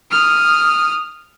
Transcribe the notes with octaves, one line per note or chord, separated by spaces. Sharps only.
D#6 F6